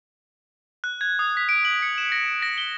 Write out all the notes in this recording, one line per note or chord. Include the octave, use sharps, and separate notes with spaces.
F#6
G#6
D#6
B6
D7
F#7
C#7
E7
A#6
A#6
G7